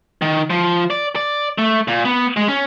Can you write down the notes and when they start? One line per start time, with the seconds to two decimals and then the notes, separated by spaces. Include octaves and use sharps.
0.22 D#3
0.50 F3
0.90 D5
1.16 D5
1.58 A3
1.88 A#2
2.05 B3
2.37 G#3
2.48 C#4